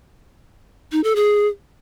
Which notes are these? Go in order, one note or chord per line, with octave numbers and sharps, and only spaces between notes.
D#4
A4
G#4